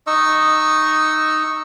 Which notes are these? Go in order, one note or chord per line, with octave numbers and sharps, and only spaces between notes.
D#4 D#5 C#6 E6